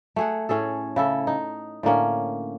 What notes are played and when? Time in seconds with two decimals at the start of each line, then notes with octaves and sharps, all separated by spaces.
0.16 A3 G#4 F#5
0.49 A2 C#4 G#4 A4
0.96 C#3 E4 A4
1.27 D#4
1.83 A2 D3 A#3 C#4